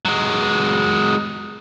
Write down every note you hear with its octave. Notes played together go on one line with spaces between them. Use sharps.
F#3 G#3